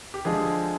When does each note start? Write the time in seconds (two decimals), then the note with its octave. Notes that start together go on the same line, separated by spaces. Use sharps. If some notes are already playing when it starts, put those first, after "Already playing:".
0.14 G4
0.25 D3 F3 G#3 G#4